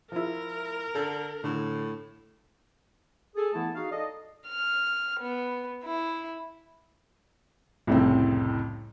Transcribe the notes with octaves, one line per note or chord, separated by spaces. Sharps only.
F3 E4 A#4
D3 A4
A2 D3
G#4 A4
E3 A3 B3 E4 A5
D#4 F#4 G#4 F5
A4 D5 D#5
F6
B3
E4
C2 F2 A2 C#3 C4